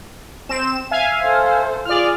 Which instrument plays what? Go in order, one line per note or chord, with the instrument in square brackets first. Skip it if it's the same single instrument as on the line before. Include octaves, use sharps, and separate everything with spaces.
[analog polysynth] C4 E7
E5 F5 G#5
[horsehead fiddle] A4 C5
[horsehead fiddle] F4 G#4 [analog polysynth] D5 F6